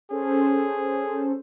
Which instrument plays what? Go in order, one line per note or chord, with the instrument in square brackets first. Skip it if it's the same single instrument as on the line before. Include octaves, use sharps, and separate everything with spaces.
[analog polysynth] C#4 A4 C5 [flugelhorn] G#4